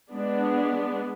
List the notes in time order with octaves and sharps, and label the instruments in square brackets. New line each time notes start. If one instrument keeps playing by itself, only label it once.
[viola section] G#3 B3 D4